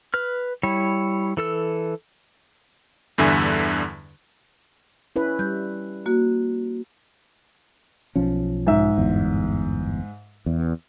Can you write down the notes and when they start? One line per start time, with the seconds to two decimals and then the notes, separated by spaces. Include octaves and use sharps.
0.14 B4 F6
0.63 G3 E4 C#5
1.37 E3 A4 E6
3.18 E2 G2 D3 E5 G#5
5.16 C#4 E4 B4
5.39 G3 G6
6.06 A#3 F#4
8.16 B1 F3 C#4
8.67 G#2 E5
8.98 G1 E2
10.46 E2